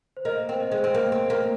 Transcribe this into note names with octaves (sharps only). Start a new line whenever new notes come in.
C5
A#3 D#5
C4 C5
D#5
G#3
C5
C4
A#3
C4
A#3